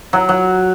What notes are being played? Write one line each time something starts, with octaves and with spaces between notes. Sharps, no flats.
F#3
F#3